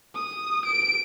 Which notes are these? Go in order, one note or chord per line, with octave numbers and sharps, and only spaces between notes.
D#6
D7